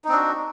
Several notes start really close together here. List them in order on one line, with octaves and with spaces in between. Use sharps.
D#4 C4 D4 F#4